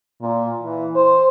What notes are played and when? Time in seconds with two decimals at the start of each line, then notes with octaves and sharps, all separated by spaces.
0.21 A#2
0.63 E3
0.95 C5